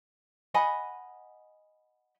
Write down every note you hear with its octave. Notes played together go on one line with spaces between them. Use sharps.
D#5 F#5 G#5 B5